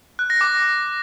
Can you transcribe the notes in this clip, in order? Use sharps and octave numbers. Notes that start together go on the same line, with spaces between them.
F#6
A#6
D6